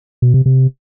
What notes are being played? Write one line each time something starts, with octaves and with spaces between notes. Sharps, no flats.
B2
C3
C3